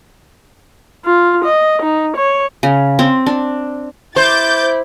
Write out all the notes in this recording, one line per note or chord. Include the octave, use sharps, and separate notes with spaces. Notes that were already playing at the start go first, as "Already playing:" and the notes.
F4
D#5
D#4
C#5
C#3
C4
D4
E4 C5 D6 G6 A6